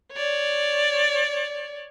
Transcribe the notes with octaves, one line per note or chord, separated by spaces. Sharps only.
C#5 D5